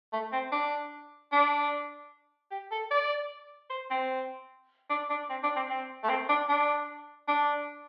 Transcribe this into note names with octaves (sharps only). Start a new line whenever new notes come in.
A3
C4
D4
D4
G4
A4
D5
C5
C4
D4
D4
C4
D4
C4
C4
A3
C4
D4
D4
D4